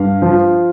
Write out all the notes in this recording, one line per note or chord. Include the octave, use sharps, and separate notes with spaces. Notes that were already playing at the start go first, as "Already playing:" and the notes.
Already playing: G2 F5
F3